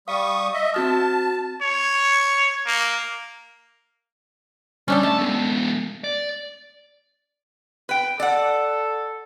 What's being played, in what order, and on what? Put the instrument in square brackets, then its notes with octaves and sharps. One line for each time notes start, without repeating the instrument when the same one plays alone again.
[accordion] G3 C#6 D#6 [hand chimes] F5
[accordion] D#5 E5
[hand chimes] C4 F#4 F6 [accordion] A5
[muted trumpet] C#5
A#3
[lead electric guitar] G3 [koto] C#4 D4 A4
[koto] A3 [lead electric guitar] A5
[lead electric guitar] G#3 B3
D5
[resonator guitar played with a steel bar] B4 G5
[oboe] A4 [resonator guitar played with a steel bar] D5 F#5